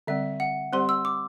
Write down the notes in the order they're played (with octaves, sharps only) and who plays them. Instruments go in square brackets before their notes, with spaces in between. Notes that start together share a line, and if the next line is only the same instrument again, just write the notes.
[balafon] D3 G3 C4 [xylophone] E5
[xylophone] F#5
[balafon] G3 C4 G4 C5 [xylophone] C6
[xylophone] E6
D6